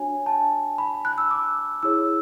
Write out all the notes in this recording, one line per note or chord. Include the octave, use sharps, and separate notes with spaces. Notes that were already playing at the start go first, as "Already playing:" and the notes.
Already playing: D4 F#4 C#5 G#5
A5
B5
F#6
E6
D6
E4 G#4 C#5 E6